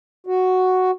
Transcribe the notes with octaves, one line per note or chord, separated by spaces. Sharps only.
F#4